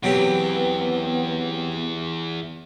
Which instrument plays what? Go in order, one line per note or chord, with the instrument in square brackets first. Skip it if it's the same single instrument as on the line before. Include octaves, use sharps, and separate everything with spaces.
[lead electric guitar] E2 [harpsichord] F#3 C4 G4 [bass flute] B3